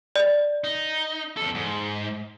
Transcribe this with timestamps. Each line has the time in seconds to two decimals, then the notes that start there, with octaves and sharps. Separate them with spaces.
0.16 D5
0.64 D#4
1.37 E2 A4
1.55 G#2